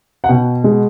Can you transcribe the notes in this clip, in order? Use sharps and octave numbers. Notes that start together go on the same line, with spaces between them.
F#5
B2 G5
G#3